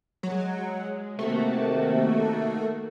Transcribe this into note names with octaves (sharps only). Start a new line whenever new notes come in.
F#3 G#3
C3 D#3 A3 A#3 F#4